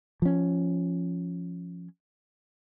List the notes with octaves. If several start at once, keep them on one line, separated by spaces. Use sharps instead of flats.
F3 C#4